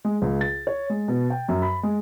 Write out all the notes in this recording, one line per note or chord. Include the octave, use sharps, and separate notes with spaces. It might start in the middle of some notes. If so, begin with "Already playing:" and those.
G#3
C#2
A6
C#5
G#3
B2
G5
F#2
B5
G#3